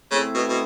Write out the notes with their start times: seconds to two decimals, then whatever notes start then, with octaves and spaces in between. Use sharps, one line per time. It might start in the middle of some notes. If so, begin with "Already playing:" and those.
0.11 C#3 A3 C4 E4
0.35 B2
0.49 B2